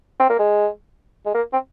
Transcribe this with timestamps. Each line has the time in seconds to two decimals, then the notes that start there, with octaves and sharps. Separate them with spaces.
0.20 C4
0.30 A#3
0.39 G#3
1.26 G#3
1.35 A#3
1.53 C4